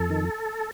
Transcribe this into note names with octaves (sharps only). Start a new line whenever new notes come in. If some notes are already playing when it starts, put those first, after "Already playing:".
Already playing: F2 A4
D#3